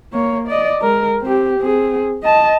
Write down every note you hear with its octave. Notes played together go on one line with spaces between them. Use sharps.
A#3 C#5
D5 D#5
G#3 A#4
C4 G4
C4 G#4
D#5 A5